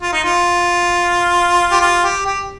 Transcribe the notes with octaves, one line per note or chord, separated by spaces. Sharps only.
F4
D#4
F4
G4
F4
G4
G4